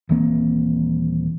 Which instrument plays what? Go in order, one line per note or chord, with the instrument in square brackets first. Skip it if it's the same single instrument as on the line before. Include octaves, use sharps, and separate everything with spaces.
[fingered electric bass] D#1 E3 A#3 C4